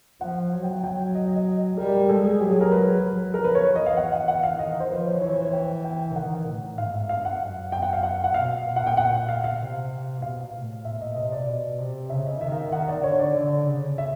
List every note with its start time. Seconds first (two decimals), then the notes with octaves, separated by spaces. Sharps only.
0.21 F3 F#5
0.53 F#3
0.63 G5
0.73 F#5
0.84 F#3 G5
1.15 D#5
1.25 D#5
1.36 D#5
1.77 G3 A#4
2.09 G#3 A4
2.24 G#4
2.40 F#3 G4
2.50 G#4
2.61 A#4
2.72 B4
3.03 F#3
3.34 F3 A#4
3.44 B4
3.55 C#5
3.65 E3
3.76 D#5
3.86 F5
3.97 F#5
4.12 F#5
4.28 F#5
4.43 F5
4.59 D#3 D#5
4.80 C5
4.90 F3 B4
5.06 C#5
5.21 E3 C#5
5.32 C5
5.43 C#5
5.53 G5
5.84 G5
6.15 D#3 F#5
6.47 A2
6.78 G#2 F5
6.94 E5
7.09 G2 F5
7.25 F#5
7.41 F#2
7.72 G5
7.82 F#5
7.93 F5
8.03 F#5
8.24 F#5
8.34 B2 F5
8.66 A#2
8.76 F#5
8.87 G5
8.97 F#5
9.29 F5
9.44 F5
9.60 C3
10.22 B2 F5
10.53 A2
10.85 A#2 E5
11.01 D#5
11.16 C3 D#5
11.32 D5
11.47 B2
11.79 C3
12.10 C#3 E5
12.26 D#5
12.41 D#3 E5
12.52 F5
12.72 D#3 F#5
12.88 D5
13.04 D3 C#5
13.19 D5
13.35 D3
13.66 C#3
13.98 E5